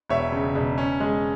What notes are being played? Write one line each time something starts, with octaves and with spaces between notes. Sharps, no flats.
E1 C#5 E5
C#3
E1
C#4
G#3